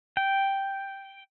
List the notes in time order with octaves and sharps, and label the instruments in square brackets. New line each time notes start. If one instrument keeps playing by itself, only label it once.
[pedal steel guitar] G5